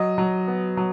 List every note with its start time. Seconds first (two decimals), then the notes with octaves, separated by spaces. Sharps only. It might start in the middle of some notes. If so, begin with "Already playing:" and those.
Already playing: F#3 D#5
0.18 F#3
0.47 B3
0.77 F#3